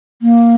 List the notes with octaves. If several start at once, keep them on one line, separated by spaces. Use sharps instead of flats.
A#3